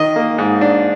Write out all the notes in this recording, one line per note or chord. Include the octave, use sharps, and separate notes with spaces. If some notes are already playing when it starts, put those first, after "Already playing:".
Already playing: D#3 D#5
A#3
G#2
D4